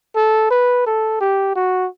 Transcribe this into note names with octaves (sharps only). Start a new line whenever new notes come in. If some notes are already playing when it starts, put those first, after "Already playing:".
A4
B4
A4
G4
F#4